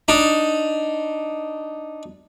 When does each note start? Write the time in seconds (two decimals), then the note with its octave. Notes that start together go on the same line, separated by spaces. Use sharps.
0.08 D4 D#4